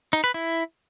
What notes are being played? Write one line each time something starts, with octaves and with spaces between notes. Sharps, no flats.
D#4
B4
E4